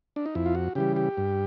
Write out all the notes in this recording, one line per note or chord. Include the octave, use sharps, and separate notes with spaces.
D4
D#4
F2 E4
F4
F#4
C#3 E3 G3 G4
G4
G2